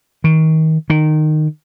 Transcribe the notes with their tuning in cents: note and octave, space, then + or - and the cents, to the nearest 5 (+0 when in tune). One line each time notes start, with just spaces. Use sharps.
D#3 +30
D#3 -15